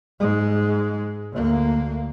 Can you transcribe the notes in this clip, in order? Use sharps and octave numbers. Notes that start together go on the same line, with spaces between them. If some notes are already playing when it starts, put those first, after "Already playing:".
G#2 G#3
D2 A#3